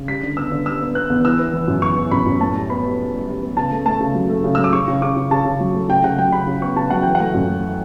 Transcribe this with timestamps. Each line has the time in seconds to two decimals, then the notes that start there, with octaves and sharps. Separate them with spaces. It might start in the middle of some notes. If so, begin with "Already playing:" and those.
Already playing: C#3
0.08 G3 B6
0.23 D3
0.37 B3 E6
0.52 D3
0.66 G3 E6
0.81 B3
0.95 B3 F#6
1.10 E2
1.25 E3 E6
1.39 B3
1.54 E3
1.68 F#2
1.82 E3 C#6
1.97 E3
2.11 F#2 B5
2.26 F#2
2.41 A2 A5
2.55 G3
2.70 B3 B5
2.84 G3
2.99 G3
3.13 G3
3.28 G3
3.43 B3
3.57 C#3 A5
3.71 A3
3.86 A3 A5
4.01 C#3
4.15 F#3
4.29 A3
4.44 C#3
4.55 F#3 E6
4.64 D6
4.73 C#3 C#6
4.88 C#3
5.02 C#3 D6
5.16 C#3
5.31 C#3 A5
5.45 C#3
5.61 F#3
5.74 A3
5.89 C#3 G5
6.04 C#3 F#5
6.18 F#3 G5
6.32 C#3 B5
6.47 C#3
6.62 B3 C#6
6.76 C#3 A5
6.90 F#3 F#5
7.03 E3 G5
7.15 F#5
7.20 A3
7.34 F#2
7.49 A3